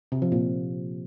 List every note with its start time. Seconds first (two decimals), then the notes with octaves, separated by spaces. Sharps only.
0.12 C3
0.22 F3
0.32 A#2